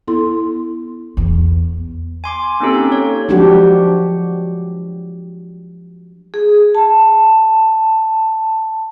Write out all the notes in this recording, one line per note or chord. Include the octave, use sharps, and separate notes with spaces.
B3 E4 A4 C6
E2 B3
G#5 C6 D6
A#3 C4 C#4 D#4 G4 A4
C#5
F3 F#3 G#3 D4 F#4 G4
G#4
A5